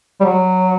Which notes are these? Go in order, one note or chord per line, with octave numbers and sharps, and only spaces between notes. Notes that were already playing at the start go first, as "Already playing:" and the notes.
G3
F#3